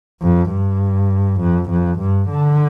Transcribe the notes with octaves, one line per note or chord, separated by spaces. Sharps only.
F2
G2
F2
F2
G2
D3